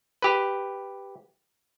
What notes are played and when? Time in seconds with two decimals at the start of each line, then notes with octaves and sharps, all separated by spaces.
0.22 G4 B4